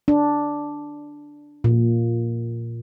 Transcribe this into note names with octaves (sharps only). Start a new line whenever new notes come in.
D4
A#2